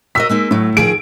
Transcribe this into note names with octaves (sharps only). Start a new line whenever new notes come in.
F#4 A#4 D#5 E6 B6
G#3 A#3 D#4
A2 F#3 A3
D#3 F3 G#4 D7